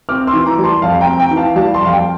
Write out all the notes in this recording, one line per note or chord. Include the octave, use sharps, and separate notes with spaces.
C4 D6 F6
C6 E6
E3
A#5 D6
G3
A5 C6
F2 F5 A5
G5 A#5
C4
G5 A#5
E3
F5 A5
G3 F5 A5
A5 C6
F2 F5
G5